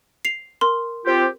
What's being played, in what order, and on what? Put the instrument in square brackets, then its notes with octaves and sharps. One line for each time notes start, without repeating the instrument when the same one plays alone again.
[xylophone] C7 F7
A#4 C6
[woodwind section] C4 F4 G4